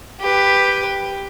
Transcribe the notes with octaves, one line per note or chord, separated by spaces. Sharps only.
G4 B4